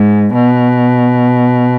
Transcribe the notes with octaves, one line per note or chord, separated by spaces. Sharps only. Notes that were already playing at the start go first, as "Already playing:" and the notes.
Already playing: G#2
B2